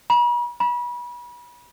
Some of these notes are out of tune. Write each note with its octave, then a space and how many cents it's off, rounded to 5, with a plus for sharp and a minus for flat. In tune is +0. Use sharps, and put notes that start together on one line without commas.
B5 -45
B5 -35